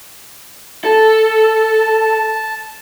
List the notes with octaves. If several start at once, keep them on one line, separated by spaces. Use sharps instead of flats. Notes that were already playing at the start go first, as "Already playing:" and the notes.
A4 A5